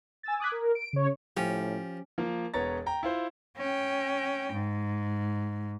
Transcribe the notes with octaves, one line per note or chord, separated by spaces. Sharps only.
G#5 E6 A6
D6 D#6 F#6 G#6 B6
A#4
D7
C#3 C#5
A2 F3 C#4 G4
F3 A#3
E1 B3 C#5 A#5 A6
G5 A#5
E4 F4 C5
C#4 G5
G#2